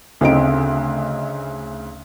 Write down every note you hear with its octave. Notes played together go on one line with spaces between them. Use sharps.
D2 C#3 C4 D#4 D7